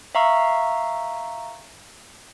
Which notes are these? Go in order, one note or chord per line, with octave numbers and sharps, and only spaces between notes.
E5 F5 A#5 C#6 E6